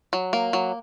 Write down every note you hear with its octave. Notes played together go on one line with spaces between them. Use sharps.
F#3
A#3
F#3